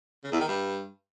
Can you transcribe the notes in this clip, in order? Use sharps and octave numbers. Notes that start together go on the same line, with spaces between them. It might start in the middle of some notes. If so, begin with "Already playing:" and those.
C#3
E2
D#3
G2